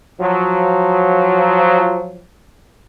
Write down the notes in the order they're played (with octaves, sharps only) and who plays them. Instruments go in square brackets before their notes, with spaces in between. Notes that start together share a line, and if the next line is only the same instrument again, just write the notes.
[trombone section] F3 F#3